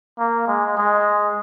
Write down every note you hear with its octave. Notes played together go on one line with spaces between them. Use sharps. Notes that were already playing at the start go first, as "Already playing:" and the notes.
A#3
G#3
G#3